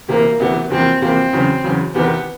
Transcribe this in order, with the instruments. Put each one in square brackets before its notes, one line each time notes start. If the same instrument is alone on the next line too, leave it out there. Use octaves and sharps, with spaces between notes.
[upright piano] D2 C3 E3 [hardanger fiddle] A#3
[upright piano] D2 C3 E3 [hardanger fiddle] B3
[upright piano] E2 C3 F3 A#3 [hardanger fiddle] C4
[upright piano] E2 C3 F3 A#3 [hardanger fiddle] C4
[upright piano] E2 C#3 F#3
E2 C#3 F#3
[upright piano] E2 C3 D#3 [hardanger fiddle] B3